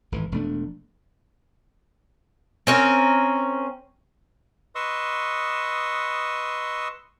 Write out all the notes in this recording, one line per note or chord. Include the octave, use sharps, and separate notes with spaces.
G#1 A2 E3
E1 F3 A3 D4
C4 C#4 A#4
B4 D#5 C6 C#6 D#6 E6